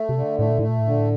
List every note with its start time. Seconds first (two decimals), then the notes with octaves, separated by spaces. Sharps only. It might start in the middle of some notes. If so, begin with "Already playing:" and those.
Already playing: A3
0.09 C3
0.16 D3
0.39 A2 A3
0.49 A#2
0.59 A2 A3
0.69 A#2
0.79 A2
0.86 A#2 D3
0.98 A2